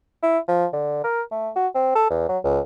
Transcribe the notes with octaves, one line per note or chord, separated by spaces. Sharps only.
E4
F3
D3
A#4
A3
F#4
C4
A4
E2
F#3
C#2